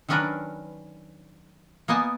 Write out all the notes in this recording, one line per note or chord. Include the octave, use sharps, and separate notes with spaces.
D#3 F#3 C#4 D4 A#4 B4
A#3 B3 D#5 G#5 A5